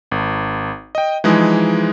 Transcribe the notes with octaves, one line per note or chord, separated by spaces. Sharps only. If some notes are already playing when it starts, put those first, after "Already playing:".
G#1
D#5 G5
E3 F3 G#3 D#4 G#4